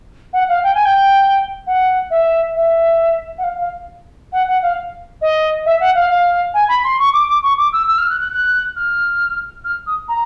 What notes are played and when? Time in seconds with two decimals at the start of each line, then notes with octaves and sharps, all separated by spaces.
0.33 F#5
0.49 F5
0.63 G5
0.74 G#5
0.85 G5
1.67 F#5
2.10 E5
2.55 E5
3.38 F#5
3.43 F5
3.58 F5
4.32 F#5
4.48 F#5
4.62 F5
5.21 D#5
5.66 E5
5.80 F#5
5.95 F5
6.09 F5
6.54 G#5
6.69 B5
6.84 C6
6.99 C#6
7.13 D6
7.28 D6
7.43 C#6
7.57 D6
7.72 E6
7.88 E6
7.98 F6
8.10 F#6
8.20 F#6
8.32 F#6
8.76 F6
9.64 F6
9.87 D#6
10.08 A#5